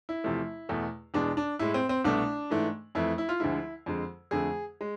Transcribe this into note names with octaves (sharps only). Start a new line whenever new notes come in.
E4
E2 C3 F3 A3
E2 B2 A3
E2 B2 G#3 D4
D4
A2 G#3 E4
C4
C4
C2 B2 A3 D4
G#2 E3 A3
F2 E3 A3 E4
E4
F4
D2 D3 F3 G#3 E4
F2 D3 G#3
F2 D3 A3 G#4
G#3